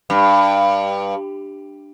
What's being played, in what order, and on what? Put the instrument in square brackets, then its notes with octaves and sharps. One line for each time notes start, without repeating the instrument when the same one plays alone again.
[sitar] G2